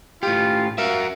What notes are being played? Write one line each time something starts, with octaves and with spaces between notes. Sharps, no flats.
A2 F4 G4
F#4 A#4 E5 F5